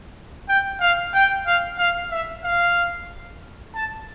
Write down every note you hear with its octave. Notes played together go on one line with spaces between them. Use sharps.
G5
F5
G5
F5
F5
E5
F5
A5